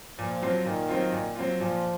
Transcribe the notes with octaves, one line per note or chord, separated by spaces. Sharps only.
A#2 F3
F#3 C4 F4
A#2 D#3
F#3 C4 F4
A#2
F#3 C4 F4
A#2 F3